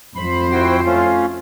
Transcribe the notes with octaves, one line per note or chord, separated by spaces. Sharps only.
F2 C5 B5
E4 F#4 G5
A3 C#4 F4